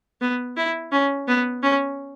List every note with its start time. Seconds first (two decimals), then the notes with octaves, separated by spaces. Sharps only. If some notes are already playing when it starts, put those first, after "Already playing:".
0.21 B3
0.57 E4
0.92 C#4
1.28 B3
1.63 C#4